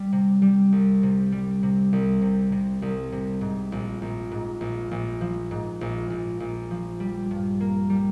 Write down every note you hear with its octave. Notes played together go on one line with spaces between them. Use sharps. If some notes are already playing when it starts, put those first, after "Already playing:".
Already playing: G3
C3
G3
C2
C3
G3
C3
C2
C3
C3
C2
C3
G#2
A#1
A#1
G#2
A#1
A#1
F3
G#2
A#1
A#1
A#1
F3
G3
G2
A#3
G3